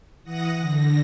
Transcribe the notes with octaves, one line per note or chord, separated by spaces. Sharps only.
E3 F#5 D#6 A#6
D3 A#6